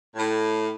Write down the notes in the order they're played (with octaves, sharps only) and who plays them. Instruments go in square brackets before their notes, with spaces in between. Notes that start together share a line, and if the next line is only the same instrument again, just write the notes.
[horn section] A2